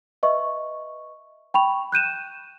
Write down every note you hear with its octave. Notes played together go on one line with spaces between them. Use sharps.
B4 D#5 E5 C#6
G5 B5 C#6 F7
F#6 G6 D#7 E7